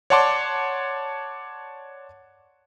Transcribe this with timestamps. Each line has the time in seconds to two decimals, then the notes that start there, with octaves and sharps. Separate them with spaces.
0.10 C#5 D5 F#5 A5 C6 D6